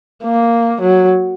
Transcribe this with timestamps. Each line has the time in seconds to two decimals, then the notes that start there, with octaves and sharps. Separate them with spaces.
0.23 A#3
0.82 F#3